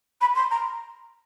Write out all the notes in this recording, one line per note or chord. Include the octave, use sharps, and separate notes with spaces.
B5
C6
A#5